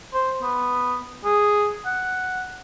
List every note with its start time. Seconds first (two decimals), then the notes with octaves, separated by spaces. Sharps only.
0.14 C5
0.42 B3
1.24 G#4
1.86 F#5